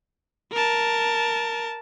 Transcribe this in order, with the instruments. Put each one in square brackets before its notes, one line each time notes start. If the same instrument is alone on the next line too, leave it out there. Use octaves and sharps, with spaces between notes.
[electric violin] A#4 A5